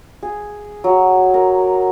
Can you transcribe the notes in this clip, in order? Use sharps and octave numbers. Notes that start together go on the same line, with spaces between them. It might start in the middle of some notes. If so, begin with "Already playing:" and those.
G#4
F#3
A#4